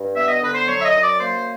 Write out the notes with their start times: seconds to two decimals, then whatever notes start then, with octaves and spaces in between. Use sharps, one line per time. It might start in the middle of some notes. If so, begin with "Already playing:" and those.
Already playing: G2
0.15 B3 E5
0.28 D#5
0.41 D3 B4
0.54 C5
0.67 F#3 C#5
0.79 E5
0.84 D#5
0.93 F#2
1.02 D5
1.18 A#3 C5